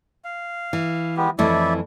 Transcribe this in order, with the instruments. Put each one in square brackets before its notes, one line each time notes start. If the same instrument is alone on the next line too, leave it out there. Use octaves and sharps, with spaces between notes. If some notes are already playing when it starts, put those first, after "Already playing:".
[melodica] F5
[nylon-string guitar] E3
[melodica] G#3 B3 G4
[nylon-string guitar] F2 E3 A3 [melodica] E4 D5 E5